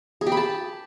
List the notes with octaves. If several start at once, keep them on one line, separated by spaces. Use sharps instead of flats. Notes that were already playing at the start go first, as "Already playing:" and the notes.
G#4
G4
B5
A5